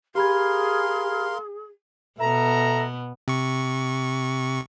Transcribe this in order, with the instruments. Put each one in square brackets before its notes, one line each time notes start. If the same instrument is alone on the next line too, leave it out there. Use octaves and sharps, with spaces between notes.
[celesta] G4 B5 G#6 [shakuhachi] G#4 [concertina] A#4 F5 C6
[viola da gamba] B2 B3 [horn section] A4 E5 A#5
[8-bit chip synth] C3 C#6